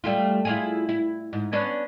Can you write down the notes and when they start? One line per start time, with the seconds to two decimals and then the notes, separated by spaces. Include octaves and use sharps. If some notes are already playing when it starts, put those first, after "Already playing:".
0.04 G3 A3 F4
0.45 E4 F4 G#4
0.89 E4
1.33 G#2
1.53 B3 C#4 D4